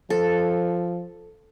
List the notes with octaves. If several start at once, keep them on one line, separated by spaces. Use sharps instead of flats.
F3 A4